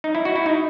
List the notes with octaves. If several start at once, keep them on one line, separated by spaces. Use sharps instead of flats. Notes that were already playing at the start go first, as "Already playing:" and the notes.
D#4
E4
F#4
E4
D#4